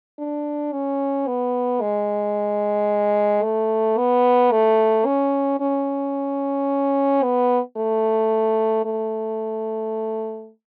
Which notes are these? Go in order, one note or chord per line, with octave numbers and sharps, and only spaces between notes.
D4
C#4
B3
G#3
A3
B3
A3
C#4
C#4
B3
A3
A3